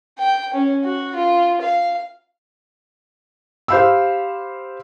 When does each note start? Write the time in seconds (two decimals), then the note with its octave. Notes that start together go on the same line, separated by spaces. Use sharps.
0.19 G5
0.54 C#4
0.85 F#4
1.16 F4
1.62 F5
3.68 G4 C5 F5 B5 E6